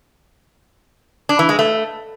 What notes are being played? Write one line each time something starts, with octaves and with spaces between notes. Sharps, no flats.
D4
E3
G#3
A3